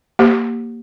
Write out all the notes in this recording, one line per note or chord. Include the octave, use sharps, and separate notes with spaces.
A#3 G4 C5